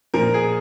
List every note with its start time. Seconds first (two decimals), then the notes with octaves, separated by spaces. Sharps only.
0.14 A#2 F3 A#4
0.34 G#4